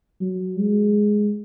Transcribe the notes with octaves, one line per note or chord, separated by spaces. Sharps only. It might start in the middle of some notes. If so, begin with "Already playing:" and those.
F#3
G#3